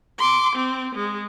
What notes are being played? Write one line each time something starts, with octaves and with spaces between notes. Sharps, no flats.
C6 D6
C4
G#3